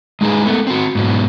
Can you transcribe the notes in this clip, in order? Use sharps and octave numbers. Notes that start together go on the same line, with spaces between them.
G#3 D#4 G#4 B4
A3 B3
C4 F#4
G#2 B2 F#3